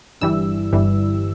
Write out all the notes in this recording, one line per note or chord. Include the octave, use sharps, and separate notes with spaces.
G1 G2 E3 G3 E6
G1 G2 E3 G3